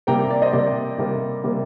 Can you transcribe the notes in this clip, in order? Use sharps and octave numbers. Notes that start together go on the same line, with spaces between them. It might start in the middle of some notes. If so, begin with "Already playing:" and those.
C3 G3 A#3 G5 A#5
D5
C5 D#5
C3 G3 A#3 D5
C3 G3 A#3
C3 G3 A#3